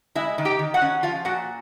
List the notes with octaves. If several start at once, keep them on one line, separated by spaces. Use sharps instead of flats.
G#3 E4 E5
D#3
G4 G5
D#3
F#4 F#5
C#4
F3 F4 F5
A#2 F#4 F#5